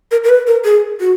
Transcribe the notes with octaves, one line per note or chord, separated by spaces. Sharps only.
A#4
A#4
B4
A#4
G#4
F#4